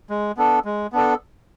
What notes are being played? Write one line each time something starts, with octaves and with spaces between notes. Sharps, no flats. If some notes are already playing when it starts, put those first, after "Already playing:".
G#3
B3 D4 A4
G#3
B3 D4 A4